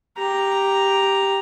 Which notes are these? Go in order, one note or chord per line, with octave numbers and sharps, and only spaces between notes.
G4 A#5